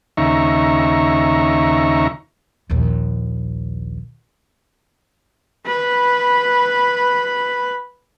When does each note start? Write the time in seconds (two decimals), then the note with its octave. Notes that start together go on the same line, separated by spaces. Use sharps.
0.17 D#2 C#3 D#4 E5 A#5 C#6
2.70 A#1 D#2
5.67 B4 B5